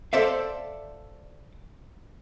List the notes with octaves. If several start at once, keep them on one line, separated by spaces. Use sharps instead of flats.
A4 C5 D5 E5 F5